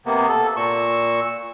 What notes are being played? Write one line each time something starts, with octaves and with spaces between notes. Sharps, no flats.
C3 A#3 B3
A4
A#2 C#6 E6